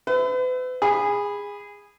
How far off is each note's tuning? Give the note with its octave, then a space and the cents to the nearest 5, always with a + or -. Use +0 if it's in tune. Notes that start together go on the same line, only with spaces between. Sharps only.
B4 +40 E5 +0
G#4 -20 B5 +0